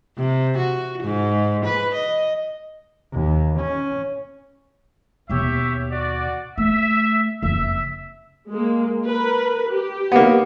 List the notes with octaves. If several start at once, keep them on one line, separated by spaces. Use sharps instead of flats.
C3
F#4
G#2
B4
D#5
D#2
C#4
D#2 B2 G4 C#5 E5
F#4 D5
A3 E5
F#1 F2 E5
G#3 A#3
A#4 B4
G4
A#3 B3